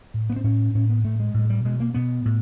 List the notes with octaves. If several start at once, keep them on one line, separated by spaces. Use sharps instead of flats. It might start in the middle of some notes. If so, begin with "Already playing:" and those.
A2
B3
C4
A2 C#4
A2 C#4
B3
A2 A3
G#3
A2 G#3
G3
B2 G#3
A#3
B2 B3
A2